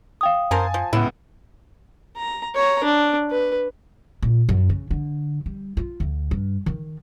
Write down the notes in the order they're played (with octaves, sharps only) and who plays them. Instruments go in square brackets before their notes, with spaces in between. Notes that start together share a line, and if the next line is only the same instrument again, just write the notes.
[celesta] F5 G5 D#6
[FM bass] F#2 [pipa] A#4 C5 [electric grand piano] G#5 A5
[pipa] F3
[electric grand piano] C#2 B3 F#5 [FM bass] A2 [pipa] E4
[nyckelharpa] A#5
C#5 A#5
D4
B4
[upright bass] A#2
F#2
C#3
D3
G3
F4
D2
G2
D#3